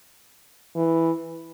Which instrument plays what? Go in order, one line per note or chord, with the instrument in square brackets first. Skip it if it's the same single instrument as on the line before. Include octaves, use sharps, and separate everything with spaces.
[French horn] E3